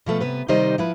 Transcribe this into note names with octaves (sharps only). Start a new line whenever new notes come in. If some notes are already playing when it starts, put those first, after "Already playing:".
B2 F3 A3 A4
C3 B3 B4
C3 D#3 G3 D#4 C5 D#5
F3 E4 B4